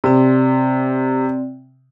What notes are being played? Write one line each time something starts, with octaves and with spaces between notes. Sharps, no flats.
C3 C4 D5